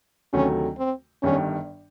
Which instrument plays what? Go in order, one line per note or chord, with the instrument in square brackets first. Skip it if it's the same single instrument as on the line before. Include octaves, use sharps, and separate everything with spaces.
[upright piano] D2 C3 D#3 F#3 A3 [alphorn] C#4
[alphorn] C4
[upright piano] G1 G2 D#3 G3 [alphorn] C#4